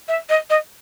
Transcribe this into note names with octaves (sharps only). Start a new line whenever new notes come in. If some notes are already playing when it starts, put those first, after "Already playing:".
E5
D#5
D#5